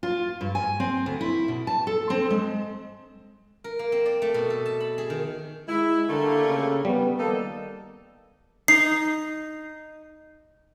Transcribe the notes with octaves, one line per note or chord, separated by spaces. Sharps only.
F4
G2
G#5
C4
D2
E4
B2
A5
A4
C4
G#3
A#4
A#3
C4
D5
A3
B2
A4
A5
B5
G#4
D#3
G#3 E4
D3 G3 A3 A#3
C#3
G3 B3
D#3 A#3 D#4 A4
D#4 C7